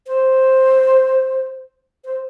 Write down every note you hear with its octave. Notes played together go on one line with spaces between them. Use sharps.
C5
C5